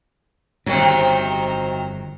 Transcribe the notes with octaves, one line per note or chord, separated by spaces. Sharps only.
G1 F2 C3 D#3 F#3